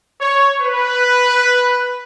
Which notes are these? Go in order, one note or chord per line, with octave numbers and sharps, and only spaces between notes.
C#5
B4